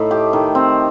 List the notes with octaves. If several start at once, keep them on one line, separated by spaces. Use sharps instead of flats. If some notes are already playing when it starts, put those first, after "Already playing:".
Already playing: A2 A3 D#4
G4
D#3
C4